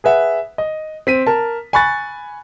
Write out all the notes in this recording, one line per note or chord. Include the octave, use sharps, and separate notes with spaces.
G#4 B4 E5 F#5
D#5
C4 B6 D#7
A#4 A5
G#5 B5 C#6 F#6 A6